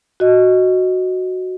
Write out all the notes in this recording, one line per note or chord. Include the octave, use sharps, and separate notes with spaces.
F#4 D#5